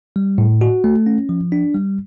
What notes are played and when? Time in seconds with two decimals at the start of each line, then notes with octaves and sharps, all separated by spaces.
0.16 G3
0.38 A2
0.61 F#4
0.84 A3
1.06 C#4
1.29 F3
1.52 D4
1.74 G3